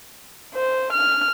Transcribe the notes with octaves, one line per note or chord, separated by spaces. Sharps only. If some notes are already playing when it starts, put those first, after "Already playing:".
C5
F6